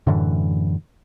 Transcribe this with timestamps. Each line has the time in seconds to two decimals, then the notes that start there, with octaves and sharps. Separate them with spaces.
0.07 F#2 A2 D3 E3